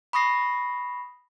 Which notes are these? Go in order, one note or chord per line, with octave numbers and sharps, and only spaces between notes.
B5 C#6 D#6 A#6 C7